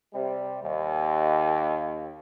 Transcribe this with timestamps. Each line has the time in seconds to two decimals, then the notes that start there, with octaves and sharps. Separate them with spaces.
0.14 C3 G3
0.64 D#2